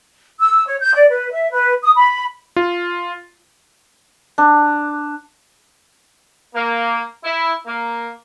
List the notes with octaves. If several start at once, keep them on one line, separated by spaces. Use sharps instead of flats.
E6
C#5
G6
D5
B4
E5
B4
D#6
B5
F4
D4
A#3
E4
A#3